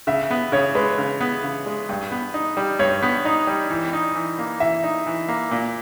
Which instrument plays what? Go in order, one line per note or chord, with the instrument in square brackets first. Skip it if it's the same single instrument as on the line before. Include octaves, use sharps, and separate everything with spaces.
[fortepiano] C#3 [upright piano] E5
[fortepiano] B3
[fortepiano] C#3 [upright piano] C#5
[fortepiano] G#3 [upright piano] B4
[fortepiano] C#3
B3
C#3
G#3
G2
B3
D#4
G3
[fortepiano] G2 [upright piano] C#5
[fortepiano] B3
D#4
G3
E3
D#4
E3
A#3
[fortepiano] E3 [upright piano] E5
[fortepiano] D#4
E3
A#3
A#2